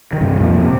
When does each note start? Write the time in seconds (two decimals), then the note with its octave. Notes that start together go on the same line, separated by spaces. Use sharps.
0.13 D#3
0.21 G2 C3
0.40 F2 A#2
0.55 D#3
0.60 C3